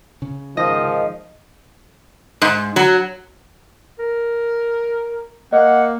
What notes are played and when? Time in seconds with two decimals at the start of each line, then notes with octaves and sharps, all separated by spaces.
0.22 C#3
0.57 G#2 D#3 F3 D#5
2.42 G#2
2.76 F#3
3.99 A#4
5.53 A#3 D#5 F#5